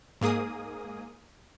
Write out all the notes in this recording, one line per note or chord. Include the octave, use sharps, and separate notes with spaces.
G#2 A#3 G#4 D#6